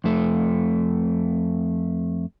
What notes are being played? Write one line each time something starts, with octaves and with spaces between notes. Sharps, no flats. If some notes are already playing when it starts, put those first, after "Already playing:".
F2 A3